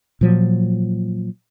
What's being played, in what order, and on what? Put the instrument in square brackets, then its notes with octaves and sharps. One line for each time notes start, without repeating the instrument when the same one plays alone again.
[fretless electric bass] A#2 F3 F#3